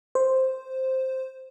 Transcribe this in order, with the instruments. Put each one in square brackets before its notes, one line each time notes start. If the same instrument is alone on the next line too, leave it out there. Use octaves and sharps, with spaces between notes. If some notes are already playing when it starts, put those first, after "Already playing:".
[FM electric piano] C5